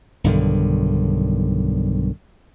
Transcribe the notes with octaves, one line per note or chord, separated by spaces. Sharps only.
B1 G2 D3 D#3